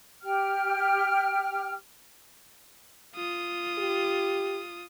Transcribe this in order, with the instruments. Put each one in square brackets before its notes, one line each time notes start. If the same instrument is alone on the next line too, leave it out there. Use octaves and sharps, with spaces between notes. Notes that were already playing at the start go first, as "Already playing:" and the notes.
[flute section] G4 G5 F6
[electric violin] F4 D#6
[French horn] G4